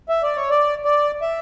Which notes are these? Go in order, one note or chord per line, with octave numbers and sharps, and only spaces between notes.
E5
D5
C#5
D5
D5
E5